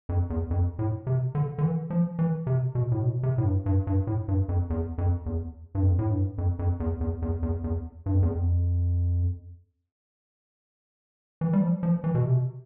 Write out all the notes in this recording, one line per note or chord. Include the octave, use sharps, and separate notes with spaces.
F2
E2
F2
A2
C3
D3
D3
E3
F3
E3
C3
B2
A2
B2
C3
A2
G2
G2
G2
A2
G2
F2
E2
F2
E2
G2
F2
A2
G2
F2
F2
E2
E2
E2
E2
E2
G2
F2
E2
F2
E3
G3
F3
F3
E3
B2
C3